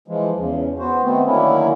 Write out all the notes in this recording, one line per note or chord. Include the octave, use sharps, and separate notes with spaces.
E3 F3 G#3
E2 C#3
B3 F#4 C5
D#3 A3 B3 C4
D3 D#3 F#3 A#3 C#4 E4